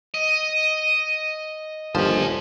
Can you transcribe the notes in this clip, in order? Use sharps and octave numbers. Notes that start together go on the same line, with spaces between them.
D#5
G1 D#2 F3 C5 G#5